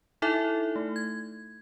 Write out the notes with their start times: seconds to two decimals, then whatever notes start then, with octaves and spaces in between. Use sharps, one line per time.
0.22 D#4 E4 A4 E5
0.76 A3
0.96 G#6